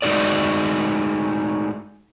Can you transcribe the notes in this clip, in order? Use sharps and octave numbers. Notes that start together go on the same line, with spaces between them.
G#3 A3 D#4 F#4 G#4 D5